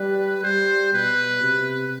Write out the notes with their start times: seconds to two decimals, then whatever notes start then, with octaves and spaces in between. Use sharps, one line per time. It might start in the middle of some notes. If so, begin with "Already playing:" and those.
Already playing: G3 B4
0.43 G3 C5
0.93 B2 B4
1.42 C3